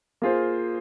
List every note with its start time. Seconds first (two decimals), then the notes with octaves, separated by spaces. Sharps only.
0.22 A#3 F4 G#4 C5